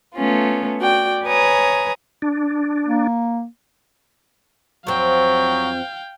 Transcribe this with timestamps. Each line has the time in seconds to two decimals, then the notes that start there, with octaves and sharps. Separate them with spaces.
0.15 A3 B3 C#4 F4
0.79 F#4 D5 G5
1.24 B4 C#5 G#5 A#5 D#6
2.22 D4
2.86 A#3
4.87 F2 F#3 C4 F5 G5